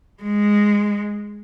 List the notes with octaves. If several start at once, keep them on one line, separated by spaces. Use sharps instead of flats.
G#3